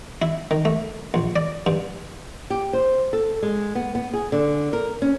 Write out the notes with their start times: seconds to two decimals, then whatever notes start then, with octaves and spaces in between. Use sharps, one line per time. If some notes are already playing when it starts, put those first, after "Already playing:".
0.22 E4
0.51 D#3
0.65 A3
1.14 A#1
1.36 D5
1.66 G2
2.50 G4
2.73 C5
3.13 A4
3.43 G#3
3.75 B3
3.95 B3
4.13 G#4
4.32 D3
4.73 A#4
5.02 C#4